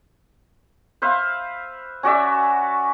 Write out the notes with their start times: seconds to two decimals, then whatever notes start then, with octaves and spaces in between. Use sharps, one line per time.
1.02 B4 C5 E5 F5
2.03 C#4 F#4 D5 E5